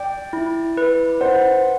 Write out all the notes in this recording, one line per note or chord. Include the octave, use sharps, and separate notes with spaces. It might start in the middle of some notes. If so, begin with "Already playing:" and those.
Already playing: D5 G5
E4
B4
C5 F#5